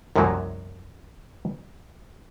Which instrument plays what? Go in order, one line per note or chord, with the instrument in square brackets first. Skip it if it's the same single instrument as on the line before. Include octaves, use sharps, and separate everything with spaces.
[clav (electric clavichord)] C2 F#2 A2 F3 F#3 A#3